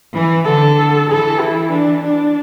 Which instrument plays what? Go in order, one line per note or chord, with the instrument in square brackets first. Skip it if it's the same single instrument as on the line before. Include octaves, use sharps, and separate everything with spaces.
[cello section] E3
[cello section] D3 [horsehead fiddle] A4
[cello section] E3 [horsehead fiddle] A4
[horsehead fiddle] E4
D4
D4